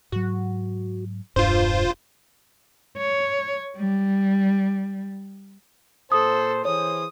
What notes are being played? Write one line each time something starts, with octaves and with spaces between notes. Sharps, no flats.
G#2 F#3 F#4
E1 G2 D4 F4 C5
C#5
G3
A#2 A4 C5 D#6
E3 G#4 C5 C#5 D#6